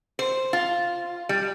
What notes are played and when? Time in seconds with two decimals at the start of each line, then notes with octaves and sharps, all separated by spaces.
0.19 C5
0.53 F4
1.29 G3